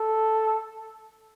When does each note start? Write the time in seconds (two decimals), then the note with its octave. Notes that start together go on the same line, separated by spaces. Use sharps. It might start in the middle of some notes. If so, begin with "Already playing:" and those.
Already playing: A4